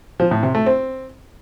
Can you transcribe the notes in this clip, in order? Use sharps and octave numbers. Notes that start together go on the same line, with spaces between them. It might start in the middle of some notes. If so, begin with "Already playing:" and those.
F3
A2
C3
A3
C4